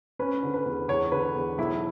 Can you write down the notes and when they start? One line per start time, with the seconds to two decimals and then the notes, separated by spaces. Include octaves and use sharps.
0.19 C#4 B4
0.43 D3
0.54 B4
0.66 E2
0.88 E2 C#5
1.12 D3 B4
1.35 E2
1.58 B1 E4